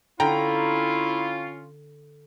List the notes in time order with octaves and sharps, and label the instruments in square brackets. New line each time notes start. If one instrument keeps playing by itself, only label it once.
[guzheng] D3 [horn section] C#4 F4 [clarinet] E4 [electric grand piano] G5 A#5